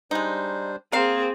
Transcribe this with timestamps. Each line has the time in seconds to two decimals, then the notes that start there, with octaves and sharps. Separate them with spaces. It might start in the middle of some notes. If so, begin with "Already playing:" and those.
0.11 G3 G#3 D4 D#4 C5
0.92 A#3 C4 G#4 A#4 F5